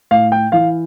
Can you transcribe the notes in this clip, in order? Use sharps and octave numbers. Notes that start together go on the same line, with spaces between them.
A2 F5
G5
E3 F5